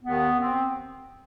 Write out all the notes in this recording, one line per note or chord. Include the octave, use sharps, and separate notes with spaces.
D#2 D#3 B3
C4